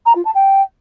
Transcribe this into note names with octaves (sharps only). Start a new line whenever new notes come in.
A#5
F4
A5
G5